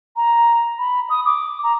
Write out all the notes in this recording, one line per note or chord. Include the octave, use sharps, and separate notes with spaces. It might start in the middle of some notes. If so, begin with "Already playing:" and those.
A#5
B5
D#6
D6
A#5